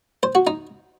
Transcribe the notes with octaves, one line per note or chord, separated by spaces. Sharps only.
C5
F#4
D#4